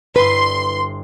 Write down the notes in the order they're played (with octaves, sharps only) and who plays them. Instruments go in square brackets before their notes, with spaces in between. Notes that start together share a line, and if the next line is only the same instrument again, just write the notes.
[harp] G1 G2 E4 [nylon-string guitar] B4 [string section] C6